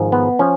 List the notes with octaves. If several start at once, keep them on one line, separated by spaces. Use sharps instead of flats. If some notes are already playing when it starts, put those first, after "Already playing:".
Already playing: G#1 G#2 F3
B3
F3 C#4